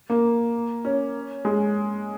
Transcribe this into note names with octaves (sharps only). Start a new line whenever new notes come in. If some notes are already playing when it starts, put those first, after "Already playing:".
A#3
C#4
G#3